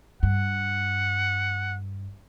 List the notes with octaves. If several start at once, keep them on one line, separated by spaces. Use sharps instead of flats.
G2 F#5